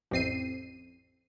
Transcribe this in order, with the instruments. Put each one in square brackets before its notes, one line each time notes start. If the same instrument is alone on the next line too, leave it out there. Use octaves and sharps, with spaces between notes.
[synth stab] A1 F2 C4 C7 D#7